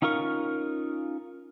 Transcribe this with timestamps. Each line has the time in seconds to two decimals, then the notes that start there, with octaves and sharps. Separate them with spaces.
0.02 C#4 D#4 F4 A#4 C#6